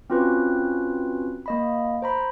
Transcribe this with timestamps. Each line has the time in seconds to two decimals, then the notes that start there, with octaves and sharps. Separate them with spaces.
0.10 C4 C#4 F4 F#4 B4
1.46 A#3 D#5 B5
2.02 C5 A#5 B5